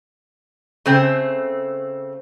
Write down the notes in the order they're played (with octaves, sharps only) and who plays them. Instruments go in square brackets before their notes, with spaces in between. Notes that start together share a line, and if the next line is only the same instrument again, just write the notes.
[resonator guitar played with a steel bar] C#3 A3 C4